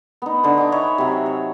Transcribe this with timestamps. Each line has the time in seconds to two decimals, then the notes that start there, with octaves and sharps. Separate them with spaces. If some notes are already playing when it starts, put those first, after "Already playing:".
0.22 B3 D#4
0.43 D3 C5
0.57 D#5 G#5 D6
0.72 D#4 B4 C#5 E5
0.98 C3 F#3
1.26 C#5